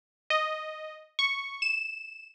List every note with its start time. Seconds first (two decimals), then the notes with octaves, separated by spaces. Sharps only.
0.30 D#5
1.19 C#6
1.62 E7